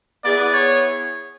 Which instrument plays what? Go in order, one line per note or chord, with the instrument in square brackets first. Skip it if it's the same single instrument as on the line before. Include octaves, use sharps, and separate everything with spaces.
[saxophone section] B3 E4 G#4 [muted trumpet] D5
[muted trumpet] C#5